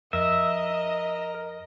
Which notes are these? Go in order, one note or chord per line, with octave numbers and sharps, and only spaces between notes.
F2 A#4 D#5 E5